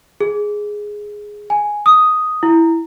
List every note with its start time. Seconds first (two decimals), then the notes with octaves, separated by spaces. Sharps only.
0.21 G#4
1.50 G#5
1.86 D#6
2.43 E4